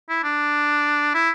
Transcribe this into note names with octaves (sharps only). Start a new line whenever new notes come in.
E4
D4
E4